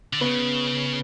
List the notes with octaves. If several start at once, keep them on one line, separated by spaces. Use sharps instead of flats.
D3
C#3 B3